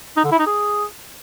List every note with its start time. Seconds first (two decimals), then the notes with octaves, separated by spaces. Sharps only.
0.17 D#4
0.24 D3
0.32 E4
0.39 D#4
0.46 G#4